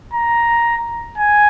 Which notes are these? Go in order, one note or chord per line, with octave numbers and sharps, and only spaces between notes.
A#5
G#5